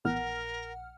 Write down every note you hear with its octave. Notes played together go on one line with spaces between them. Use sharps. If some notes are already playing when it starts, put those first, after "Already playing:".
A#1 A2 E3 B3 A#4 F#5 F6